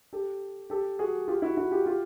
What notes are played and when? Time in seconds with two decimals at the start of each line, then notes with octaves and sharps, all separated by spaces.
0.13 G4 A4
0.70 G4 A4
0.99 F#4 G#4
1.28 F4 G4
1.42 E4 F#4
1.57 E4 F#4
1.71 F4 G4
1.86 F4 G4